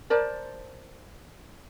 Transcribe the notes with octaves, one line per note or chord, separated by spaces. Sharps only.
A#4 C5 D5 A5